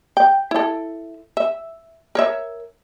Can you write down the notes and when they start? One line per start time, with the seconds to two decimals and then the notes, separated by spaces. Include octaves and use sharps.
0.17 G5
0.51 E4 A4
1.37 E5
2.15 A#4 C#5 E5